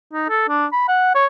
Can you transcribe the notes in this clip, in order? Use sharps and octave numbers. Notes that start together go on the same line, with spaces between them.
D#4
A4
D4
B5
F#5
C#5